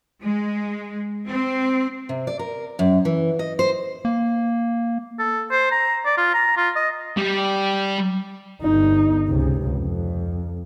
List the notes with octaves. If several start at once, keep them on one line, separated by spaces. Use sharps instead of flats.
G#3
C4
C3
D5
A#4
F#2
E3
D#5
C5
A#3
A4
C5
A#5
D5
F4
A#5
F4
D#5
G3 G4
G1 D#4
C#2 C3
F2